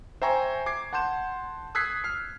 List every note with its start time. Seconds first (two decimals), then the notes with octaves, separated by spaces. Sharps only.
0.22 C5 E5 G5 G#5 A#5 C#6
0.66 D6 G#6 C7
0.93 F#5 A5 C6 G6 E7
1.75 D#6 E6 F#6 G#6 B6 C7
2.04 F6 C7